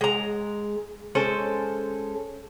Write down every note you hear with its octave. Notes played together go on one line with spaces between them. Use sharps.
G#3 A#5
G#3 C#4 A4 C5